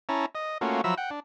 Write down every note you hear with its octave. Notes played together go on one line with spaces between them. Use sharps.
C#4 E4 A5 A#5
D#5
A3 A#3 C#4 F4 F#4
F3 F#3 E5 A#5 B5 E6
F#5 G5
D4